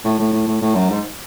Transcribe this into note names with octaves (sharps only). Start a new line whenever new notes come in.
A2
A2
A2
A2
A2
F#2
G#2